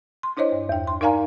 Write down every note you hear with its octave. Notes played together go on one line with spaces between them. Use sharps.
C6
D4 E4 C5 C#5 D#5
G2
E2 G5
C6
D#4 A#4 D5 F5 G#5 A#5